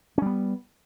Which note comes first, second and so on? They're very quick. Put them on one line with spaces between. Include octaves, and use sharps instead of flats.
C#4 G3 B3